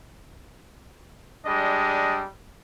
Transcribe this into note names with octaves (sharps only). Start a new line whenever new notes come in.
G3 G#3 D4 D#5